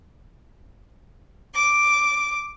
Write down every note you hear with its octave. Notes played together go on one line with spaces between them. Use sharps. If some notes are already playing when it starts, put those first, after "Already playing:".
D6